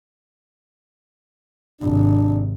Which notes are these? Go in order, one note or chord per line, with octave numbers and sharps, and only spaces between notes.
G#1 C3 D4